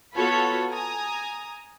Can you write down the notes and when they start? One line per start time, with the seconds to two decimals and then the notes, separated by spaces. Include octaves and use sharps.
0.15 B3 F4 F#4 A4 C#5 B5
0.69 G#5 A#5 D#6